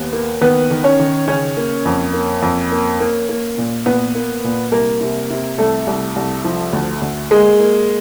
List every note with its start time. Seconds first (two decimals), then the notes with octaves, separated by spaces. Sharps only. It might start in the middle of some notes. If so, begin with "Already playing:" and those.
Already playing: D#2 B3
0.13 A#3
0.41 D#3 B3 B4
0.71 D#3
0.84 C#4 C#5
1.00 D#3
1.28 C#3 C#4 C#5
1.57 A#3
1.85 F2
2.13 A#3
2.42 F2
2.72 A#3
3.00 A#3
3.29 A#3
3.58 A#2
3.86 A#2 B3 B4
4.15 A#3
4.44 A#2
4.72 C2 A#3 A#4
5.01 C3
5.30 C3
5.58 C2 A3 A4
5.87 C2
6.16 C2
6.44 F3
6.73 D2
7.02 D2
7.31 G#3 A#3 G#4
7.60 A#3